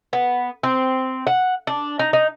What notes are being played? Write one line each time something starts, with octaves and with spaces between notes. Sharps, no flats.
B3
C4
F#5
D4
D#4
D#4